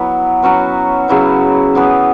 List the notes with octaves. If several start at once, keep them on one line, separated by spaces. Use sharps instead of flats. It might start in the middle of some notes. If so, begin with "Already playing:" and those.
Already playing: F#3 B3 E4 B4
F#3 C#4 F#4 B4
C#3 F#3 E4 B4
E3 B3 G#4 B4